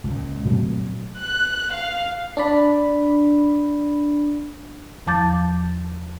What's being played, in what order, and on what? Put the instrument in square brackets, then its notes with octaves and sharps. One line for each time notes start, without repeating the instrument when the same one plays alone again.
[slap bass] C#2 A#2
A#2 F#3 A3 C4
[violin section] F#6
F5
[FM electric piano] D4 D5 B5
[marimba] E2 F3 A5 D6 G6 A6